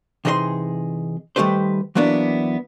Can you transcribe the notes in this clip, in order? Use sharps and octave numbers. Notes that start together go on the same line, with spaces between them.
C3 E3 D#4 G#4 C#5 C6
D#3 G3 A3 G4 B4 C5
E3 F#3 A#3 B3 D4 E4